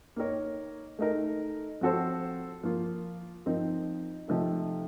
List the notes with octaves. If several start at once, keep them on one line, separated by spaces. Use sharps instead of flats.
A#3 D#4 A#4 C#5
A3 D#4 A#4
F3 C4 F#4 A4 C5
F3 A#3 F4
F3 C4 D#4 A#4
C3 F3 A3 D#4 A4